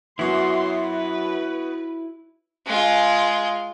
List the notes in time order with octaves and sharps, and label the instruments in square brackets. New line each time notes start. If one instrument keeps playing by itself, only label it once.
[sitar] F#2 [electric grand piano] B3 F#4 [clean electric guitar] E4 [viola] C6
[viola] B4
[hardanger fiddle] G#3 F4